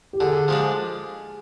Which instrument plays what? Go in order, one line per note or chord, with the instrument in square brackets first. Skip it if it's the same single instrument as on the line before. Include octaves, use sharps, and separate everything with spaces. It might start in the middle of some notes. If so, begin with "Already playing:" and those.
[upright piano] G4
[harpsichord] D3 [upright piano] G#4
[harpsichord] F3 G#3 D4